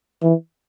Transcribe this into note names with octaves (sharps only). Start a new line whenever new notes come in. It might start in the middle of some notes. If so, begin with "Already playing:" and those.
E3